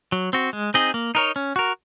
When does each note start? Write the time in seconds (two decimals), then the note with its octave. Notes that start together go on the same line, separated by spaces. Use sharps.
0.12 F#3
0.33 C4 F#4
0.53 G#3
0.74 C4 D#4 G#4 D#5
0.94 A#3
1.15 D#4 A#4 C#5
1.36 C#4
1.56 F#4 A#4